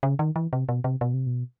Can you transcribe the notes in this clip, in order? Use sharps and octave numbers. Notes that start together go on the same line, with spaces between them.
C#3
D#3
E3
C3
B2
C3
B2
C3
B2